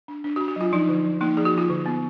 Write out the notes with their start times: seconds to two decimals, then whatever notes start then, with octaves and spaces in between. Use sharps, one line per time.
0.08 D4
0.24 D4
0.36 F#4
0.41 D4
0.48 F#4
0.56 F#3 F4
0.73 F3 D#4
0.89 D3
1.05 F3
1.21 A#3 D#4
1.37 F3 G#4
1.45 F#4
1.54 F3 F4
1.70 D3
1.86 B3